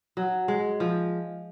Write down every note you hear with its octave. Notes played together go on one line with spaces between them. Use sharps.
F#3
G#3
F3